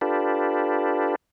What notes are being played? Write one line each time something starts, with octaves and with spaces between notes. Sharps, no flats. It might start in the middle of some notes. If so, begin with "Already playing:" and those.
D4 F4 G4 A4 B4